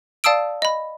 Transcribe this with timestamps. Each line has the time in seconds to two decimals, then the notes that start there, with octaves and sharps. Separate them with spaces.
0.24 D5 F5 A5 D#6 E6 D7
0.62 D#5 B5